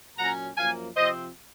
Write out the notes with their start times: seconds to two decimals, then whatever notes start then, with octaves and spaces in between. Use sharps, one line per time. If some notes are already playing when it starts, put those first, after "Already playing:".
0.17 A#2 F#3 C#4 F#5 A#5
0.57 F#2 F3 A#3 F5 G#5
0.96 C3 F3 C4 C5 D#5